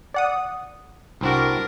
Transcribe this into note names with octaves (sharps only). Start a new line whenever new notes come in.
D5 F#5 D#6
C2 C4 D4 F#4 A#4